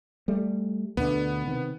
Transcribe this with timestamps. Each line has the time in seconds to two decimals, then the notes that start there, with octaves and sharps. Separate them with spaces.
0.28 G3 A3
0.97 D2 B2 D3 B3
1.47 C3 D#3